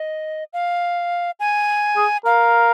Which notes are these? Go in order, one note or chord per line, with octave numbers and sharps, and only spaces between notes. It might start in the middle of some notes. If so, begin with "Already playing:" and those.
Already playing: D#5
F5
G#5
G#4
A#4 F5